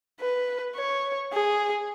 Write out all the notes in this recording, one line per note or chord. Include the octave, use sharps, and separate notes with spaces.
B4
C#5
G#4